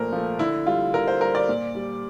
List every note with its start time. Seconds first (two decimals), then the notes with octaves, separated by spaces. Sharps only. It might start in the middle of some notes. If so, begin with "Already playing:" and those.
Already playing: A#2 F3 A3 A#4 C5
0.12 F3 A3
0.39 D3 E4
0.66 G3 F4
0.94 D3 A#4
1.08 C5
1.21 G3 A#4
1.35 D5
1.49 A#2
1.75 G3